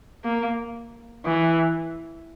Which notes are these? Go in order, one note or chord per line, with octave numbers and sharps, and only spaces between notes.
A#3
E3